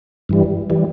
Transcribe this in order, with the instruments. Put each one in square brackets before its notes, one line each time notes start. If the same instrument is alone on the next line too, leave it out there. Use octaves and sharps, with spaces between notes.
[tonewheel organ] G2 E3 G3
E3 G3